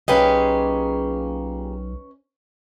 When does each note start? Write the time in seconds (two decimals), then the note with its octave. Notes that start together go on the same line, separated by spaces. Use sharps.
0.08 B1 A#2 C#4 G4 G#4 B4 D#5